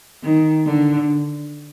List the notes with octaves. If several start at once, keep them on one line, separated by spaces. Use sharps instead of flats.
D#3
D3